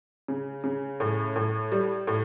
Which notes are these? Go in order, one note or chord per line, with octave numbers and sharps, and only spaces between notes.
C#3
C#3
A2
A2
G3
A2